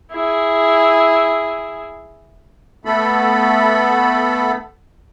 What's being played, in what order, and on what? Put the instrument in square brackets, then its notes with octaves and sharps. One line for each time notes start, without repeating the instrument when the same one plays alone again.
[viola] E4 G#4
[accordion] A3 B3 A4 B5